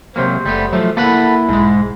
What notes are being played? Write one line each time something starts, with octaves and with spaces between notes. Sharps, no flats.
C3 F#3 A#3 C5
F#1 G3 A3 B3
F3 F#3 A3
A#3 E4 A4 B4 F#5
B1 G#2 G#3